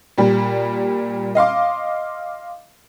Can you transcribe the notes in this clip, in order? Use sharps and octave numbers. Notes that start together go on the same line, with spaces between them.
A#2 G3
D#5 F5 C6 D6